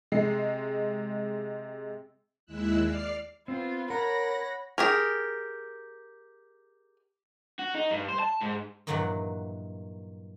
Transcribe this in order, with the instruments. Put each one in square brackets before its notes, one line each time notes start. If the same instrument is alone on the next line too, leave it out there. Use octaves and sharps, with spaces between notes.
[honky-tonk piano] C3 G#3 C7
[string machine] D#2 G#3 E4 E6 F#6
D5 F6 C7
[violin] B3 F4 [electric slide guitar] C4
[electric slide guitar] A#4 [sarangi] C#5 [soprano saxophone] F#5 [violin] B5 A#6
[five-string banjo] G4 G#4 A#4
[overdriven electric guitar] F#4
D#4
G2
C5
A5
G#2
[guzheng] G2 A#2 D#3 E3 F#3 F#5